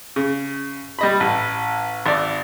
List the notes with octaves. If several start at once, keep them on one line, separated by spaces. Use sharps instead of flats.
C#3
G3 D#5 B5
A1
G#1 D5